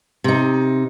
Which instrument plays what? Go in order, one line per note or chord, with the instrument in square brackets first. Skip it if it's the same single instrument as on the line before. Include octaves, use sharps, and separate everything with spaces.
[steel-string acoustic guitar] C3 D#4